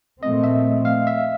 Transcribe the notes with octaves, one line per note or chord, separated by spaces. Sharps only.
A#2 F3 A3 C4 D#5
E5
F5
E5